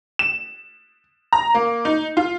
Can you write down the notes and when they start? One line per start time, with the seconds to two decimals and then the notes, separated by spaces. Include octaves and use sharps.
0.19 E7
1.33 A#5
1.54 A#3
1.85 D#4
2.17 F4